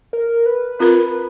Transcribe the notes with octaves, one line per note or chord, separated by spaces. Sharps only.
A#4
B4
C4 F4 A#4 B4